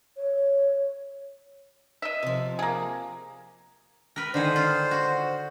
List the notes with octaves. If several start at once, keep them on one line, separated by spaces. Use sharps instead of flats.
C#5
D#5 E5
C3 F3
A#3 G#4
A#4 B4
D3 D#3 G#4 C5
F4
F#4